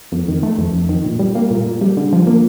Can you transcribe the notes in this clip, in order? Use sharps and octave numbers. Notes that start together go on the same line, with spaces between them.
F2
D#3
A3
F2
F2
D#3
A#2
G3
A#3
A#2
A#2
G3
D3
F3
A#3